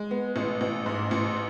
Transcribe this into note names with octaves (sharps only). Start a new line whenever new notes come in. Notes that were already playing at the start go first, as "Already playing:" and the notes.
Already playing: G#3
B3
A1
A1
G#2
A1